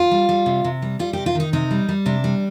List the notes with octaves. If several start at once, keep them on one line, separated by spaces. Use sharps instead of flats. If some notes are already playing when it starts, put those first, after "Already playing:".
Already playing: F4
G3
G3
C3
C3
G3
G3 F4
C3 G4
F4
D#3 D#4
C3 D#4
G3
G3
C3 D4
G3